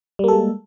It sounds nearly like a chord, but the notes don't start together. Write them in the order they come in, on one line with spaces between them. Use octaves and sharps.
G3 A#3 A4 G#3